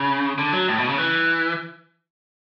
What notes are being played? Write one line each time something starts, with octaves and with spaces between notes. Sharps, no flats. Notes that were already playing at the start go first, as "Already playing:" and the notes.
Already playing: C#3
D3
F#3
A2
B2
C#3
E3